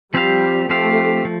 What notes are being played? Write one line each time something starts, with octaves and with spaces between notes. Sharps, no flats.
F3 G3 C4 G4 C5 F5
F3 A3 C4 G4 C5 F5
F3